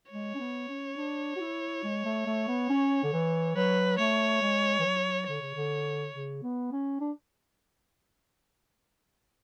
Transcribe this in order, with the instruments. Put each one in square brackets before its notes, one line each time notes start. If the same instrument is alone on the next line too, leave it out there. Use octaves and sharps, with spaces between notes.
[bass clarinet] G#3 [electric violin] C#5
[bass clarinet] C#4
B3
C#4
D4
F#4
E4
G#3
A3
A3
B3
C#4
D3
E3
[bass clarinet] F#3 [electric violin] B4
[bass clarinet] A3 [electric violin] C#5
[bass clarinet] G#3
E3
F#3
[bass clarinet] D3 [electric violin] C#5
[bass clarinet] C#3
D3
C#3
B3
C#4
D4